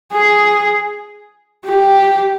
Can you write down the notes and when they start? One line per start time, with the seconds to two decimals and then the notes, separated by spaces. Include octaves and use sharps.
0.13 G#4
1.65 G4